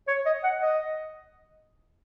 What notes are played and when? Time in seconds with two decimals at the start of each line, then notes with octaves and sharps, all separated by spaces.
0.08 C#5
0.26 D#5
0.43 F#5
0.62 D#5